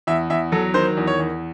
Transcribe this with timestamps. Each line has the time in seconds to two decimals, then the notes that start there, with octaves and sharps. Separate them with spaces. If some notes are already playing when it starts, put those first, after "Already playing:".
0.07 E2 E5
0.30 E2 E5
0.52 F#3 A4
0.74 D#3 C5
0.97 E2
1.07 C#5
1.19 E2